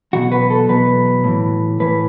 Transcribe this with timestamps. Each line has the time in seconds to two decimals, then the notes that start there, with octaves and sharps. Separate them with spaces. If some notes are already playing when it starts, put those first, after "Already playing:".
0.13 E2 B2 F#3 F#4
0.32 B4
0.50 A4
0.69 E2 B2 F#3 B4
1.24 A2 E3
1.80 A2 E3 B4